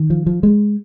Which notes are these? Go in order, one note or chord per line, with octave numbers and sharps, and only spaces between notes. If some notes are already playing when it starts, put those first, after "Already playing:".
Already playing: D#3
F3
F3
G#3